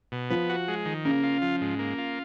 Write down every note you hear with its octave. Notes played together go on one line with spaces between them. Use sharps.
B2
F3 B3
F#4
G#3
D#3
C#3 A#3
F4
F3
G#2
A#3
F4